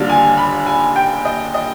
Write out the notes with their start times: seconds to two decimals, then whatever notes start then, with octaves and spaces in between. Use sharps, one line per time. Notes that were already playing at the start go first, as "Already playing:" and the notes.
Already playing: D#2 D3 G3 D4 F4
0.09 G#5
0.37 B5
0.66 G#5
0.96 G5
1.25 D#5
1.54 D#5